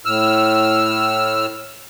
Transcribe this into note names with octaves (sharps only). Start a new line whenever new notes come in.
A2 E6 F6